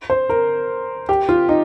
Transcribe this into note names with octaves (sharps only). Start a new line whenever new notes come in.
C5
A#4
G4
F4
D#4